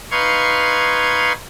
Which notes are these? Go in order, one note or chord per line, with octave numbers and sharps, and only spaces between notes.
D#4 B4 F5 C6 C#6 G#6